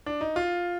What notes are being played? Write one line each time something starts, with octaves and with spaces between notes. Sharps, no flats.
D4
D#4
F4